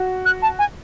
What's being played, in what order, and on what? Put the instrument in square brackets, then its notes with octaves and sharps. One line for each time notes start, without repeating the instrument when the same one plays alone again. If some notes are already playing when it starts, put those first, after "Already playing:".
Already playing: [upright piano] F#4
[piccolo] F#6
A5
G#5